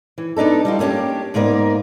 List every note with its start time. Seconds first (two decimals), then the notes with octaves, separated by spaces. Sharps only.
0.18 E3
0.36 B3 D4 D#4 A4
0.65 G3 E4 F4
0.79 A#3 B3 C#4 D4 G4
1.34 G#2 A#3 B3 A#4 D5